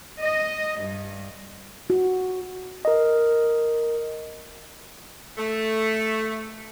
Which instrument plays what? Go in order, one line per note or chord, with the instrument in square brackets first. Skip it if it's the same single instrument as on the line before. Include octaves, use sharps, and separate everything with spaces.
[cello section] D#5
G2
[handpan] F#4
[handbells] A#4 D#5
[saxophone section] A3